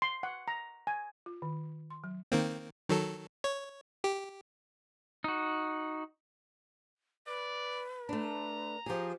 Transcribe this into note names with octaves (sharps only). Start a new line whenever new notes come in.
C6
F#5
A#5
G#5
F4
D#3
C6
F#3
D#3 A#3 C4
D#3 F#3 A4
C#5
G4
D#4 F#4
B4 D5
A3 D4 A#5
F3 G4 G#4